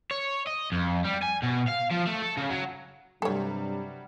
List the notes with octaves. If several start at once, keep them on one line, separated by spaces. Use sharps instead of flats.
C#5
D#5
F2
G3
G#5
B2
F5
F3
A3
A4
C#3
F#3
G2 C3 F#3 G3 A4 C#5